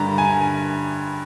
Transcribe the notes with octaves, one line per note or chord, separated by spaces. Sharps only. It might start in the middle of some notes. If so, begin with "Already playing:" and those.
Already playing: G2 D3 G3 A#5
G#5